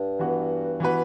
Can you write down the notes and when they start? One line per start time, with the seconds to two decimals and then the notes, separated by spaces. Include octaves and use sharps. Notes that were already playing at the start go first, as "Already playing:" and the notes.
Already playing: G2
0.19 E3 B3 F#4
0.80 E3 B3 F#4 B4